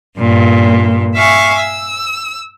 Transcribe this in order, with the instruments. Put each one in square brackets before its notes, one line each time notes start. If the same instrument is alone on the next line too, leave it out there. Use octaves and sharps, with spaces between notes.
[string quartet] G2 A#2
E5 F5 G#5 C#6
E6